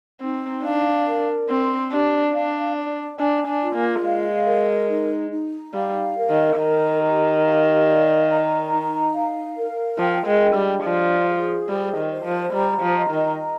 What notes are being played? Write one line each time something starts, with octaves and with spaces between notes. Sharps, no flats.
C4 D#4
D4 F5
A#4
C4 C6
D4 G4
D4 F5
D5
D4 G#5
D4
F4
A#3
G#3 F5
A#4
D#4
D#4
G3 F5
A#4
D#3
D#3 A#5
G4
F5
D5
A#5
D#4
F5
A#4
F3 G5
G#3
D4
G3
F3 D5
G#4
G3 C5
D#3
C5
F3
G3 A#5
F3
D#5
D#3
A#5